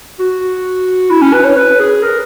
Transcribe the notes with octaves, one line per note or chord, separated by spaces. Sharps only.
F#4
E4
C#4
B4
C#5
B4
G#4
A#4